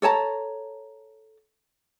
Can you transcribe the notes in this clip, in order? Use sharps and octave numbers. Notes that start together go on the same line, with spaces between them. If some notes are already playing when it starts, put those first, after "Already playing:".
A4 C#5 A5 A#5